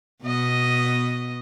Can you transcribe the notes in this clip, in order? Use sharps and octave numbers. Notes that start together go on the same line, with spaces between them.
B2 B3 D#5